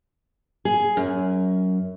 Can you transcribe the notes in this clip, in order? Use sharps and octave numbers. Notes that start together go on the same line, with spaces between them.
G#4
F#2